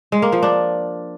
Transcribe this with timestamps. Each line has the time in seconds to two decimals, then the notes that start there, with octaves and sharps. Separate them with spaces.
0.12 G#3
0.22 A#3
0.32 F3
0.42 D4